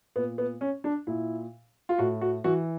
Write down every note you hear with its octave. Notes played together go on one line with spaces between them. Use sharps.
A#2 B3
B3
C#4
D4
A#2 E4
F4
A2 F#4
F#4
E3 F#4